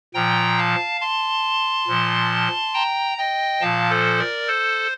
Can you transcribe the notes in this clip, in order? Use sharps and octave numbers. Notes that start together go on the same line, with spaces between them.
A#2 F3 G5 A#5
F5 A5
A5 C6
A#2 F3
G5 A#5
D#5 G5
A#2 F3 F5 A5
A4 C5
A#4 D5
A4 C5